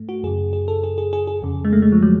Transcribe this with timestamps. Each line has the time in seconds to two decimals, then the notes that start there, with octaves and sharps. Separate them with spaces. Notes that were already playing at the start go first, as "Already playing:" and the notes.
Already playing: G#2 A3
0.09 F#4
0.23 F#2 C#3 G#4
0.53 G#4
0.68 A4
0.84 G#4
0.98 G#4
1.13 G#4
1.27 G#4
1.42 F2 C#3
1.65 G#3
1.73 A3
1.82 G#3
1.92 F3
2.03 F#3